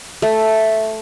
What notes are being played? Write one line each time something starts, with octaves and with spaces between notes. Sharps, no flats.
A3